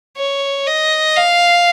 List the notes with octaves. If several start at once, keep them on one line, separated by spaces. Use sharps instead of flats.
C#5
D#5
F5